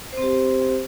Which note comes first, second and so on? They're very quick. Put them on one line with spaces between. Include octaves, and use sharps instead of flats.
C5 C4 G4